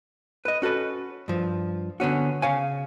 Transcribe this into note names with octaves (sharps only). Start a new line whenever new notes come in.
B4 D#5
C#4 F#4 A4 B4
G2 F3
D3 B3 C#4 F#4
C#3 C#5 F5 G#5